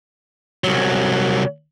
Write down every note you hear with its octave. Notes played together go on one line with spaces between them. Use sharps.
C2 F#3